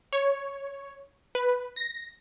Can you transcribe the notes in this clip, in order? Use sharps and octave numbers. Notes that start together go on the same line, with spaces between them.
C#5
B4
A#6